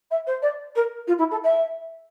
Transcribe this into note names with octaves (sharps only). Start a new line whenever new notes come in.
E5
C5
D5
A#4
F4
E4
A4
E5